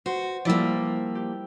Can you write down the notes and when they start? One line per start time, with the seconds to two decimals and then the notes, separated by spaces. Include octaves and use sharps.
0.06 F#4 C5
0.45 F3 G3 A#3 E4 D5
1.15 G4